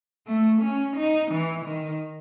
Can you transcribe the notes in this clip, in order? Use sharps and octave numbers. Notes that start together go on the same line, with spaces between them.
A3
C#4
D#4
E3
D#3